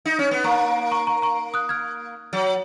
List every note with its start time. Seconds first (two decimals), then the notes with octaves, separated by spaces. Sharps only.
0.05 D#4
0.19 C#4
0.31 B3
0.44 A#3 A#5 C#6
0.91 A#5 C#6
1.07 A#5 C#6
1.22 A#5 C#6
1.54 D#6 F#6
1.69 F6 G#6
2.33 F#3